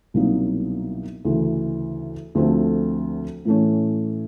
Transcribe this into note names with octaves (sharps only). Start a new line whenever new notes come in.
C2 B2 F#3 A#3 D#4
D2 C#3 E3
D2 D3 F3 A3 C4
A2 E3 A3 C#4